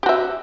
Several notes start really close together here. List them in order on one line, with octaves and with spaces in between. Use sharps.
G4 F#4 E5